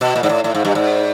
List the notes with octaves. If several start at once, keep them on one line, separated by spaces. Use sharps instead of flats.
B2 D#5
A#2
G#2 D5
A2
A2 D5
G#2 F5
G2 D#5
G#2 D5